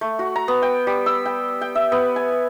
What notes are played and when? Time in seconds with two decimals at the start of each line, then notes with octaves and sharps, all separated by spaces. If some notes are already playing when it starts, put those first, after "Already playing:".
0.01 A3
0.19 F#4
0.36 A#5
0.48 B3
0.62 G5
0.87 G3
1.06 E6
1.26 G5
1.61 G5
1.75 E5
1.92 B3
2.16 G#5